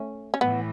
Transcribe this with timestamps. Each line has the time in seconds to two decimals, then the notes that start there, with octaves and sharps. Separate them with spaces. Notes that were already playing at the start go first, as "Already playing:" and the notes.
Already playing: A3 C#4
0.34 C#4
0.41 A2 E3 B3